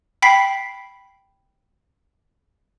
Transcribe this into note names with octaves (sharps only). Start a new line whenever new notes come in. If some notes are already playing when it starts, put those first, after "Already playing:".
G5 B5 B6 C7